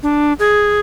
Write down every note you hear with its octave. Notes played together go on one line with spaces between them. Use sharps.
D4
G#4